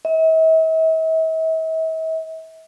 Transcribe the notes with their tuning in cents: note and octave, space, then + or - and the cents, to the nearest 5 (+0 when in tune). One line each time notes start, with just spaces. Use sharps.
E5 -45